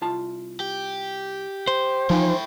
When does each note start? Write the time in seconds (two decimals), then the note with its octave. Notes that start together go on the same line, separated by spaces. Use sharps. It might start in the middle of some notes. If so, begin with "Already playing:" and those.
0.01 C2 F4 A5
0.60 G4
1.67 C5
2.10 E2 F3 D#4 E4 G5 G#5